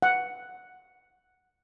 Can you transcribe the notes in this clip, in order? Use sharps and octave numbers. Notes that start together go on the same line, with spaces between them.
F#5